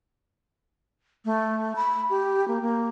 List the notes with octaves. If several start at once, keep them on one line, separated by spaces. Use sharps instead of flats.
A3
B5
G4
A#3
A#3